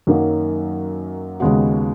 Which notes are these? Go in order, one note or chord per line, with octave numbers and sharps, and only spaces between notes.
F#2 D#3 F#3 A#3
D#2 C#3 G#3 B3 F#4